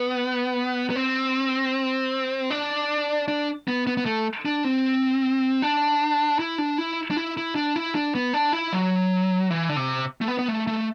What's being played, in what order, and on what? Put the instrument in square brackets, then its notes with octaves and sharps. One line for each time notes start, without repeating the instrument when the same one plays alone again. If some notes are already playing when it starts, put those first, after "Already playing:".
Already playing: [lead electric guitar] B3
B3
C4
D4
D4
B3
B3
B3
A3
D4
C4
D4
E4
D4
E4
D4
E4
E4
D4
E4
D4
B3
D4
E4
F#3
E3
D3
C3
A3
B3
B3
A3
A3